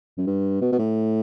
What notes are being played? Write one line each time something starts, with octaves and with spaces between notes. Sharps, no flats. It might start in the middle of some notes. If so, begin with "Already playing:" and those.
F#2
G2
B2
B2
A2